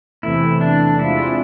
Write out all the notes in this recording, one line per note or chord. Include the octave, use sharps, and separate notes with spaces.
E2 C3 E3 A3 E4
D4
C3 G#3 D4 E4 F4